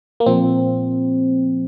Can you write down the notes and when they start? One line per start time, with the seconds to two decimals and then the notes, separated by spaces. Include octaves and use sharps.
0.20 A#3
0.26 A#2 F3 C4